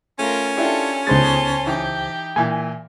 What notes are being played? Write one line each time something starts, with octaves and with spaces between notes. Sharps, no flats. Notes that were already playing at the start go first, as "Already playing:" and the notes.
A3 C#4 F4 A#4
D4 E4 F4 G4 A4
C#2 G#3 B3 D#4 C5 A5 C6 A6
E3 D#4 G4
A#2 E3 G#5